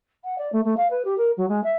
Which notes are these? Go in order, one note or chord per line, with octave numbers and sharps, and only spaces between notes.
F#5
D5
A3
A3
F5
B4
G4
A#4
F#3
G#3
E5